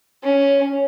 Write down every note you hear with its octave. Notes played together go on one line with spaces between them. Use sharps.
C#4